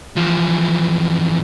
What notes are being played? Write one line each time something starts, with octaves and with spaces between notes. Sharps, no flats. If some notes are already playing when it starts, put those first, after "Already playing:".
E2 F3